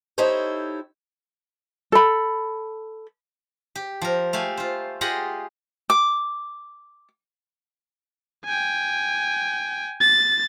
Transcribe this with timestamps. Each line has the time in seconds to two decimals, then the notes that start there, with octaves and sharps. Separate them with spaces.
0.18 D#4 E4 G4 A4 C5 C#5
1.92 A4 B5
3.75 G4
4.02 F3 A#4
4.33 A3 G4 F5 G#5
4.57 F4 C5
5.01 F4 G4 G#4 D#5 F#5 G5
5.90 D6
8.45 G5 G#5
10.01 A6